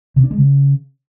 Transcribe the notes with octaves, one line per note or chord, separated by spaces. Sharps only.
C3
D4
G#3
C#3